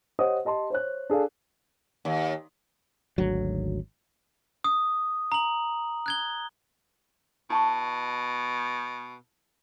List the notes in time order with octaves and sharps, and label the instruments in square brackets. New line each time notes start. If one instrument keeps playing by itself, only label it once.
[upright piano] G4 C5 C#5 D#5 F#5 D#6
G4 D#5 A5 C6
C5 C#5 F#6
D4 G#4 A4 F5
[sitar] D#2
[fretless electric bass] G#1 D2 F#3
[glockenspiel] D#6
A#5 F#7
F#6 G#6 G7
[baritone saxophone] B2 [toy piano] E4 A5 C#6